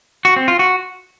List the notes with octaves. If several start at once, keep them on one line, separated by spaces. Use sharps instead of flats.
F#4
C4
F4
F#4